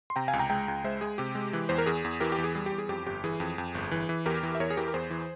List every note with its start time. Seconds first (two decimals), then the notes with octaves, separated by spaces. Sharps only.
0.10 C6
0.16 C3 G5 A#5
0.28 F5 G#5
0.33 C#2
0.39 G5 A#5
0.50 G#3 G5 A#5
0.68 C#2
0.84 G#3 C5 E5
1.01 G#3 G#4
1.18 C3 G4
1.35 G#3
1.53 E3
1.69 E2 C5
1.78 A#4
1.86 E2 G#4
2.04 E2
2.20 E3 G4 A#4
2.32 G4
2.38 E2
2.44 G#4
2.55 G3 G#4
2.66 G4
2.72 E2
2.78 G#4
2.89 F2 G4
3.06 G1 G4
3.24 E3 G#4
3.40 F2
3.58 F2
3.75 G1
3.91 E3
4.09 E3
4.26 E2 G4 A#4
4.43 E3
4.55 E5
4.60 E2 A#4 C#5
4.70 G#4
4.77 E3 G4 A#4
4.88 A#4
4.94 E2 G#4 C5
5.10 E3